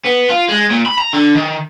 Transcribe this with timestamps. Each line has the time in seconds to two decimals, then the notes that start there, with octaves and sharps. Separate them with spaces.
0.05 B3
0.30 F4
0.49 G#3
0.71 A#2
0.86 B5
0.98 A#5
1.13 D3
1.35 D#3